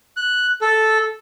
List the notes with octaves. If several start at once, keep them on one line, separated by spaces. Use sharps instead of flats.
F#6
A4